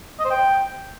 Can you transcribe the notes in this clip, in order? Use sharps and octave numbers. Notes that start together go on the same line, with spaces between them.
D#5
C5
G5